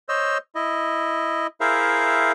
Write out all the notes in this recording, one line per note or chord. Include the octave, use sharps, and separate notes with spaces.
C5 C#5 D#5 E6
E4 D#5
E4 G#4 A#4 C5 E5 F5